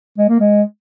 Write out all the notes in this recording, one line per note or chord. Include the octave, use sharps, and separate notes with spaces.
G#3
A#3
G#3